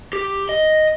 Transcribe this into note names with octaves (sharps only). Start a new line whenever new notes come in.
G4
D#5